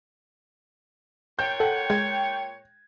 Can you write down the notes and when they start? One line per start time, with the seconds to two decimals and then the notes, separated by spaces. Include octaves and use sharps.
1.39 A#2 C#5 G5 G6
1.60 A4 F#5
1.90 G#3 G#6